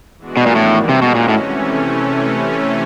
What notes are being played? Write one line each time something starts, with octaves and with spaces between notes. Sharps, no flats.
E3 G#3 B3 D4 F#4
B2
A#2
A2 D#3 G3 A#3
C3 G#3 C#4 F#4
B2
A#2
A2 C3 E3 A3 C#4